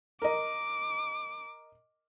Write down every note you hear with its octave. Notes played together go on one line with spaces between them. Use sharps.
A#4 D#5 D6